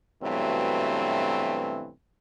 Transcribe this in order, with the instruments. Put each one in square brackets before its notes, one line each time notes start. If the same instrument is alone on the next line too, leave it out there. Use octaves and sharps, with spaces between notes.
[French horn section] G2 B2 E3 F#3 A3 C4